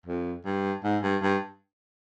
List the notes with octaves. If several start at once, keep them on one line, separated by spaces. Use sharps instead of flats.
F2
G2
G#2
G2
G2